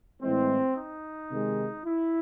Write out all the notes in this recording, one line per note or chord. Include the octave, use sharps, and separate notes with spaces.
A2 E3 G#3 C4
D#4
C3 D#3 G#3
E4